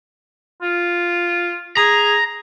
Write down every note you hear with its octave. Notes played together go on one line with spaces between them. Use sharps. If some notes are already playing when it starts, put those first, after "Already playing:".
F4
G#4 A#5